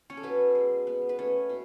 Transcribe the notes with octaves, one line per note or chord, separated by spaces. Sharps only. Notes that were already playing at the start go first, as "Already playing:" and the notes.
C#4 C#5
A4
B2 B3 B4
G#3
B3
B4
A3 C#4 C#5
B2